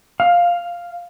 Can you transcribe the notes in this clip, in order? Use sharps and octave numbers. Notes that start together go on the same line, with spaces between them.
F5